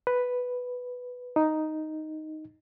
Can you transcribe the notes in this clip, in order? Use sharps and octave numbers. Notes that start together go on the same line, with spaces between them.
B4
D#4